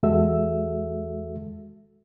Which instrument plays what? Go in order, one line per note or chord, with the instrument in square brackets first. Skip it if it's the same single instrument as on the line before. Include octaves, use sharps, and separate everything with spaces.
[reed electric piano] E2 G#3 F#4 A4 E5 E6